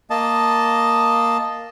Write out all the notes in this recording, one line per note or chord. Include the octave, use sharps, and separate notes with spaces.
A#3 D#5 A5